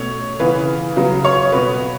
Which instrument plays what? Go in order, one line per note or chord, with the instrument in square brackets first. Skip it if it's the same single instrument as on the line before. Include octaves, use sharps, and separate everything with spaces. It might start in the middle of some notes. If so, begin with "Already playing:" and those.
Already playing: [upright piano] B2 A3 C#4 C#5
C#3 E3 B3 B4
C#3 F#3 B3
C#5
B2 B3 B4